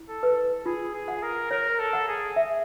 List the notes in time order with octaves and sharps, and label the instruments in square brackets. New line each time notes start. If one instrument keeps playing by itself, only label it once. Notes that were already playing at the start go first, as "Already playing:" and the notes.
Already playing: [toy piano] E4
[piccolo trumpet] A4
[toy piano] B4
[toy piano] F4 [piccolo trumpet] G#4
[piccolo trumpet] G#4
[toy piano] F#5
[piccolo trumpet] A#4
[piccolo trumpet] A#4 [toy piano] C#5
[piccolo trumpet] A4
[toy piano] F#5
[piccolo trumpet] G#4
[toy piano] E5